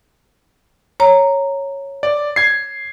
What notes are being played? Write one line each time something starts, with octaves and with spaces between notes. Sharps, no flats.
C#5 A#5
D5
G#6 C7